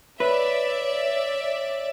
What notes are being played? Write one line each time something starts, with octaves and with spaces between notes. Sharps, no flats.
B4 C#5 D5 E5